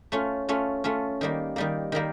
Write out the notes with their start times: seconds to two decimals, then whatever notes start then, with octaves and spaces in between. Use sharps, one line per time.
0.12 A3 C#4 F4
0.49 A3 C#4 F4
0.84 A3 C#4 F4
1.21 D#3 G3 A#3
1.56 D#3 G3 A#3
1.92 D#3 G3 A#3